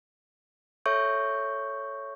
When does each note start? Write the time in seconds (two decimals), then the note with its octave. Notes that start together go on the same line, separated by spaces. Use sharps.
0.86 A4 C#5 E5 C#6 G6